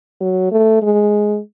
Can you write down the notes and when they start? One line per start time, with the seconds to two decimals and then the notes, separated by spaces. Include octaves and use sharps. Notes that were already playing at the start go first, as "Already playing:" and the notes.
0.21 F#3
0.52 A3
0.82 G#3